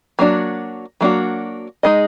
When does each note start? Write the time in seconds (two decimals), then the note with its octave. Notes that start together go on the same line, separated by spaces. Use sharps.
0.19 F#3 A#3 D4 F#4
1.01 F#3 A#3 D4 F#4
1.83 G#3 D#4 G#4 D#5